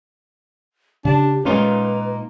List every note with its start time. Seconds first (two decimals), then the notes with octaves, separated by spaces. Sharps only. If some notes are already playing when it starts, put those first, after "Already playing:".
1.05 C#3 D4 G4
1.45 A#2 G#3 A#3 B3 C#4 D#4 F4 B4